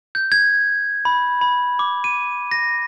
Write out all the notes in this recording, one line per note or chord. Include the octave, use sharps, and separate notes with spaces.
G6
G#6
B5
B5
D6
D#7
A#6